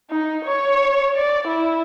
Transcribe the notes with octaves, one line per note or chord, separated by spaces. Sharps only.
D#4
C#5
D5
E4